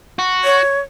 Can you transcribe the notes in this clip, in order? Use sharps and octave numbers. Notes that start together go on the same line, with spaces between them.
F#4
C#5